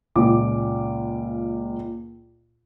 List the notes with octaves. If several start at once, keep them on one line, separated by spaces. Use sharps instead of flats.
C#2 A#2 D6